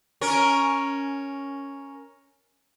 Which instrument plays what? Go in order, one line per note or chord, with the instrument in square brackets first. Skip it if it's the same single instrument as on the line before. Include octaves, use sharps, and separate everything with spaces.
[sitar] C#4 A#4